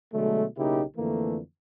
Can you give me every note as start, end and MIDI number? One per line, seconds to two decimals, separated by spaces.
0.14 0.45 47
0.14 0.45 50
0.14 0.45 54
0.14 0.45 56
0.14 0.45 57
0.57 0.82 35
0.57 0.82 49
0.57 0.82 58
0.57 0.82 63
0.57 0.82 64
0.57 0.82 67
0.97 1.38 41
0.97 1.38 50
0.97 1.38 52
0.97 1.38 57
0.97 1.38 58